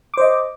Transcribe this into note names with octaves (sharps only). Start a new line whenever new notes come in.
C5 D#5 D6